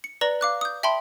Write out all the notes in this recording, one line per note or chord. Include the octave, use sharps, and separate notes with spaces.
C#7
B4 D5 A#5 A#6 F#7
F5 D6 F#6
D#6 G6
E5 G5 A5 B5 C6